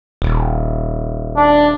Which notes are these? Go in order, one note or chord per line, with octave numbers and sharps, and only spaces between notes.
D#1
D4